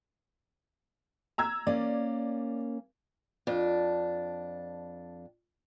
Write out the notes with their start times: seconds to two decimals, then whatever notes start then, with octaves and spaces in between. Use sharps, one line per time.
1.38 A#5 E6 G#6
1.67 A#3 C#4 D5
3.47 F2 D4